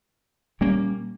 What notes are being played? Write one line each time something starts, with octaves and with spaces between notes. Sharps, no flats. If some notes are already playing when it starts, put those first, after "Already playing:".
A#2 G3 A#3 C#4